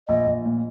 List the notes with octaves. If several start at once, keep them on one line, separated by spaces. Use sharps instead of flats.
A#1 D#5
A#1
A#2